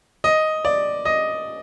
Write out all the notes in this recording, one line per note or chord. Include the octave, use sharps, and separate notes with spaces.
D#5
D5
D#5